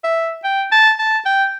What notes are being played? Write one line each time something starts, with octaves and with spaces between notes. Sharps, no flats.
E5
G5
A5
A5
G5